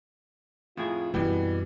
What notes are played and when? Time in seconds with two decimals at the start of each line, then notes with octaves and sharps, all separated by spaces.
0.77 F2 A2 E4 F4 G#4
1.14 F#2 B2 E3 G3 C4 E4 F#4 G5